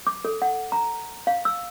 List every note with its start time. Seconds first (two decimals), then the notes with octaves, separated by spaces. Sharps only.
0.07 D6
0.25 A4
0.42 F#5
0.72 A#5
1.27 F5
1.45 E6